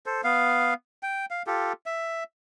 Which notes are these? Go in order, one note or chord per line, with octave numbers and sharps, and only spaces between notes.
A4 C5
B3 F5
G5
F5
F4 G4 A4
E5